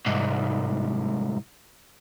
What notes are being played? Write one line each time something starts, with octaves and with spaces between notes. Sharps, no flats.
C2 G#2